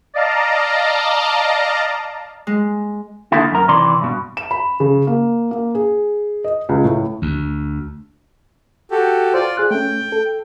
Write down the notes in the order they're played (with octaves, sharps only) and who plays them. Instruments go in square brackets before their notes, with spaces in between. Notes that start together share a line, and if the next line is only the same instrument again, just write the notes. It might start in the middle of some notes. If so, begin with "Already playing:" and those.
[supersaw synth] D5 D#5 F5 A5 A#5
[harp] G#3
[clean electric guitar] D3 D#3 A3 A#3 E4
F#2 A#4
C3 D#3 E3 D5 C6
G2 B2
[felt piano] E7
B5
C#3
A#3
A#3
G#4
D#5
C#2
A2
[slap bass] D2
[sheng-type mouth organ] F#4 G4 A4
[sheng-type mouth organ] F4 D5 [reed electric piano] C5
[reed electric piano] G#4 F#6
[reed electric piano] A3 C#4 [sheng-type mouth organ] G5
[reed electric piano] A4